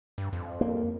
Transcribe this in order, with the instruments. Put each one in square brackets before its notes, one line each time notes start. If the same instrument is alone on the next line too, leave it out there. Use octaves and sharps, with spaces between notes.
[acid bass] G2
F2
[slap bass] A#3